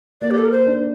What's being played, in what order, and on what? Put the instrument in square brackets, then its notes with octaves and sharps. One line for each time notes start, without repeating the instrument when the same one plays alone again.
[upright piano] A#3 [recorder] D5
[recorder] G4
A4
A#4
C5
[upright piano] D4